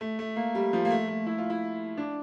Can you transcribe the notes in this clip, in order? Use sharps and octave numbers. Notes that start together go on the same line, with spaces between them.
A3
A3
A#3
G3
F3
A#3
A3
A3
E4
F4
E4
D4